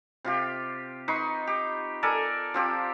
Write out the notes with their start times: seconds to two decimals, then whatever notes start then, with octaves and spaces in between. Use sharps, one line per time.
0.25 C3 F4 G4
1.08 D#4 B4 C6 C#6
1.47 G4
2.03 A4 A#4 D5 G#5
2.54 F3 C4 G4